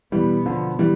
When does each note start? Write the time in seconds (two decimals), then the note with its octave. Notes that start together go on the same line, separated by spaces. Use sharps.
0.12 B2 E3 G3 B3
0.46 D3 F3
0.79 E3 G3